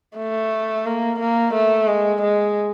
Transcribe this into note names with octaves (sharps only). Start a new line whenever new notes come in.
A3
A#3
A#3
A3
G#3
G#3